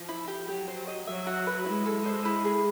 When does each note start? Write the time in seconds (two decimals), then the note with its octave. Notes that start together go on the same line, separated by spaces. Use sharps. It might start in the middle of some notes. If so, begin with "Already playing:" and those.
Already playing: F3
0.09 E4
0.28 G4
0.47 F#3 G4
0.68 C5
0.87 D#5
1.07 F#3 E5
1.26 F#4
1.47 B4
1.66 G#3 E4
1.85 A4
2.06 C5
2.25 E4
2.45 G#4